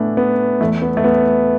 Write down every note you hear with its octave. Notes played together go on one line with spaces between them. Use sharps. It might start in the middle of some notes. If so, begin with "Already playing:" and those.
Already playing: A2 E3 A3 B3 D4 E4
B3
E2 E3 A3
B3
A3
B3